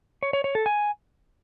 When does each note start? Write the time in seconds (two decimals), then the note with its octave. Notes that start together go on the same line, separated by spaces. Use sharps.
0.23 C#5
0.33 C#5
0.44 C#5
0.55 A4
0.66 G#5